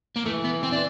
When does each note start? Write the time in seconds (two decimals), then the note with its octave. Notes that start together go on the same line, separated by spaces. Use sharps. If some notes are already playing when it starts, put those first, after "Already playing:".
0.16 A#3
0.26 E3 A3
0.44 B3
0.63 C4
0.72 D4